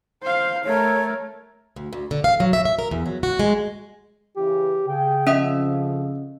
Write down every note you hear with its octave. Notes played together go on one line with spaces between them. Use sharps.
C5 F5
A3 A#4 C#5
D2
D2
D3
F5
F#3
E5
E5
A#4
E2
F#3
F#4
G#3
C#3 E3 G4
C#3 G#4 G5
F2 F3 C#4 D#5 E5 D#6